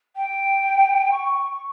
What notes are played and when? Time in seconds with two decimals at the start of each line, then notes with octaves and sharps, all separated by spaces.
0.16 G5
1.12 C#6